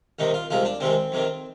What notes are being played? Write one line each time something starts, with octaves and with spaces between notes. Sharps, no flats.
C2 C3 D#3 D#4
F4
C2 C3 F3 G#3 F4
D4
C2 C3 D#3 G#3 C4
F2 C3 D#3